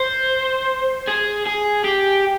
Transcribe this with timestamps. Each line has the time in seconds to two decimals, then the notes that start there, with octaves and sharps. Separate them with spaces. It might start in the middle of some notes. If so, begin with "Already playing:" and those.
Already playing: C5
1.08 G#4
1.47 G#4
1.84 G4